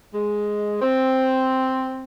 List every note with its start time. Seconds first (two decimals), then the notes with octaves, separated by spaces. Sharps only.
0.13 G#3
0.82 C4